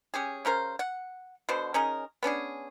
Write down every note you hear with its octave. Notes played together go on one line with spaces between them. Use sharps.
C#4 G4 G#4
C#3 C#4 A#4 C5
F#5
B2 D3 F#4 C5
C#4 D#4 G#4 A#4
B3 C#4 D4 G#4